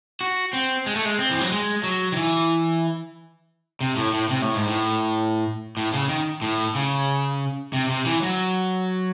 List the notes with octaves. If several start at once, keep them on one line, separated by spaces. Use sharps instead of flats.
F#4
C4
G#3
A3
G#3
C4
E3
F#3
G#3
F#3
D#3
E3
C3
A2
A2
C3
A2
G#2
A2
A2
C#3
D#3
A2
C#3
C3
C3
E3
F#3